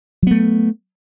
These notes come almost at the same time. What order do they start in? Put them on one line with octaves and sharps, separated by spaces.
F#3 B3 A3